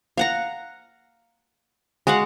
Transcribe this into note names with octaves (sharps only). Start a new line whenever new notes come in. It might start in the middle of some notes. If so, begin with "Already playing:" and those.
F5 F#5 A#5
G#3 F#4 F5 F#5